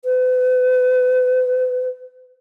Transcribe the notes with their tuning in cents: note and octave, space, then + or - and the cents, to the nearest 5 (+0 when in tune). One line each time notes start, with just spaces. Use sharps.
B4 +40